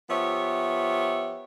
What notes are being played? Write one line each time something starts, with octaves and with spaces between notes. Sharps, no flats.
F3 B3 G4 C#5 E5